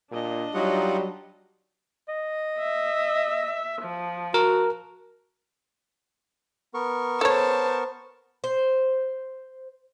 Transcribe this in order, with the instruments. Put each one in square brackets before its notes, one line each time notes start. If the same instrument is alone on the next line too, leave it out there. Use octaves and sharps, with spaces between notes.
[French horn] A#2 [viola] D4 D#5
[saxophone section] F#3 [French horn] G3 [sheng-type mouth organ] D#4 F4 F#5
[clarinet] D#5
[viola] E5
F3
[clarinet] F#4 [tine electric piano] A#4
[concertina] B3 A#4 C#6
[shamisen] A4 C#5 [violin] C5 A5
[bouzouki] C5